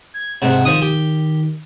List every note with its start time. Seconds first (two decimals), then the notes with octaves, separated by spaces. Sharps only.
0.14 G#6
0.42 G#2 C3 F#5
0.65 D#3 F3 D#6
0.82 G4